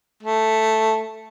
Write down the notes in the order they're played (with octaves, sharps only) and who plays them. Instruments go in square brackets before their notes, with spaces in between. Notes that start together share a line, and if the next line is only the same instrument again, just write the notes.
[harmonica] A3